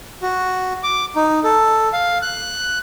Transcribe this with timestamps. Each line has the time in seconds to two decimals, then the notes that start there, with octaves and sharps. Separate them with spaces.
0.22 F#4
0.83 D6
1.16 D#4
1.44 A4
1.93 F5
2.22 F#6